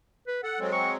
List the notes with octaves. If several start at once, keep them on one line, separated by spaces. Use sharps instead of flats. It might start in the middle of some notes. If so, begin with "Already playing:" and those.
B4
A4 F#5
F#3 G#3 C4
C#6